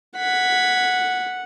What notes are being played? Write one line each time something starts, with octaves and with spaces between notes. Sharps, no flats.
F#5 G#6 B6